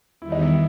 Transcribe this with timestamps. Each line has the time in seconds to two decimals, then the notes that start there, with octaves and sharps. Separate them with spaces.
0.21 E2 D#3 G3 B3 E4
0.32 D#4
0.42 E4